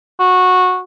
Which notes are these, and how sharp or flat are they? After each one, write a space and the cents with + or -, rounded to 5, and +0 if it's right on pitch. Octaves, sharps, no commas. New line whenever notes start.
F#4 -15